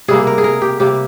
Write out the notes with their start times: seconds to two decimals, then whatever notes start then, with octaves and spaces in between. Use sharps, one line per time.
0.08 C3 G3 A#3 G#4
0.27 A#4
0.38 G#4
0.44 A#4
0.62 G4
0.80 C3 G3 A#3 G4